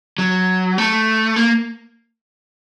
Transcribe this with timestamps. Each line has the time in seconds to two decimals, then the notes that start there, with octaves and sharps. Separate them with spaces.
0.18 F#3
0.78 A3
1.36 A#3